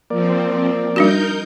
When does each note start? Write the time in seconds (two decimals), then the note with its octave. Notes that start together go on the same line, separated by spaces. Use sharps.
0.10 F3 A#3 C4 D5
0.96 G3 D4 D#4 F#4 A#4 G6